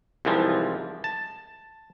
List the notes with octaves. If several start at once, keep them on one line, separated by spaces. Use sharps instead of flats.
C2 G#2 E3 F3
A5